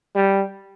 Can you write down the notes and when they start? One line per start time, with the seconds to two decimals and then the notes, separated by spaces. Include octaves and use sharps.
0.15 G3